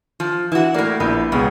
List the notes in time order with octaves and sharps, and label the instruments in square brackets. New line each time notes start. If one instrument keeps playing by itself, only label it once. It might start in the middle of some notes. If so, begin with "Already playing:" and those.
[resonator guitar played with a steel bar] F3
[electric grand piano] E3 [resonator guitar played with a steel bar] E4 F#4
[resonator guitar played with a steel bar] A2 A#3 [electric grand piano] A#4 D5
[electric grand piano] A#1 E4 G6 [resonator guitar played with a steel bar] B3
[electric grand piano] C#2 B3 G#4 [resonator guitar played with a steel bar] B2